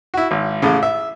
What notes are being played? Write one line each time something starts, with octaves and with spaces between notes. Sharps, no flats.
E4 F#4
G#1
A1 A2 C#3
E5